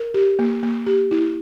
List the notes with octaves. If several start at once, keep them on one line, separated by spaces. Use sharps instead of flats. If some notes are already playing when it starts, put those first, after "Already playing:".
Already playing: A#4
G4
A#3
A#3
G4
E4